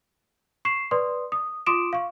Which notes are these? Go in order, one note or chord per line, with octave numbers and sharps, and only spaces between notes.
C#6 C7 E7
B4 D5 C6 D#6
D#6
F4 C6 D6 D#6 D7 E7
F5 C#6